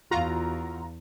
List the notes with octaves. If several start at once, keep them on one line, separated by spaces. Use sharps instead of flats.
E2 F4 F#4 A#5